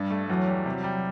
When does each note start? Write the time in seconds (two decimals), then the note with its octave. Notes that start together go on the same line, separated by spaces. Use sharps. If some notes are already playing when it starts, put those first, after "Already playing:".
Already playing: G2 G3
0.10 A3
0.29 E2 F#3
0.47 G3
0.66 C3
0.84 G3